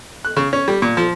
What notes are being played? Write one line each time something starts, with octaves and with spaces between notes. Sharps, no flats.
F#6
C#3
C#4
G3
A#2
F3